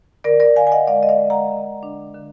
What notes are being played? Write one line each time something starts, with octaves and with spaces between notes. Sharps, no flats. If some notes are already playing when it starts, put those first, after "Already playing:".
D3 A#4 D5
A#4 D5
D3 F5 G#5
G#5
D#5 F#5
G#3 D5 F5
D#5
D5 F5
G#3
F#5 A#5
D3
D4
D3